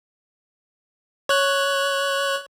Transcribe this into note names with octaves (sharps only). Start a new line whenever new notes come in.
C#5 F#6